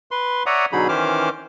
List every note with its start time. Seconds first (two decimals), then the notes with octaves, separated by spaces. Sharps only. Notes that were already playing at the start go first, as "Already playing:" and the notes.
0.11 B4 C6
0.46 C#5 D5 E5 F#5 A#5 D#6
0.72 B2 D3 F#3 D#4 G#4 B5
0.89 D#3 E3 C#4 C5 D6 F6